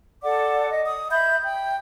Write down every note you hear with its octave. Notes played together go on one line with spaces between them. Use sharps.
A4 D5 F#5 D6
D#5
D#6
E5 B5 G6
G5